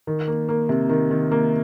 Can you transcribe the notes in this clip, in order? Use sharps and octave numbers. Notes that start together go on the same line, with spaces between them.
D#3
A#3
A#3
C3
D#3
D#3
A#3